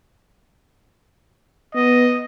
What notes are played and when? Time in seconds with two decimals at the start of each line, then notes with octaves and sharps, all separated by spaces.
1.75 B3 D#5